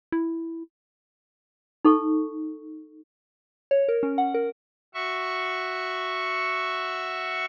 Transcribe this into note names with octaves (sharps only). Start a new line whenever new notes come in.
E4
D#4 A4 C#6
C#5
A#4
C#4
F#5
A#4
F#4 E5 C#6